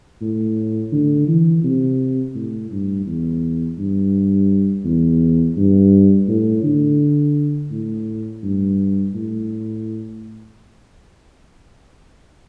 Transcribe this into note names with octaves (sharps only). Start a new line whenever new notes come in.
A2
D3
E3
C3
A2
G2
E2
G2
E2
G2
A2
D3
A2
G2
A2